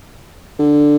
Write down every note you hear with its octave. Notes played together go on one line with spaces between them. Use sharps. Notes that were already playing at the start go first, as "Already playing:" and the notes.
D3